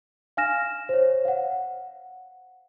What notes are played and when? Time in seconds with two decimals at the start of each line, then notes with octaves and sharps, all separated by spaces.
0.37 F5 G#5 F6 A#6 E7
0.89 C5 C#5
1.25 F5 F#5